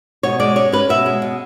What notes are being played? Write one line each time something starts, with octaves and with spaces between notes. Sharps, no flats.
B2 C#5
G#3 D5
C#4 C#5
C#4 B4
B2 E5
G#3
B2